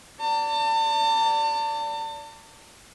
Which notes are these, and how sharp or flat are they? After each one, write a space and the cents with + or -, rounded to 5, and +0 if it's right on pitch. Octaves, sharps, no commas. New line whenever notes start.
D5 -20 A5 +35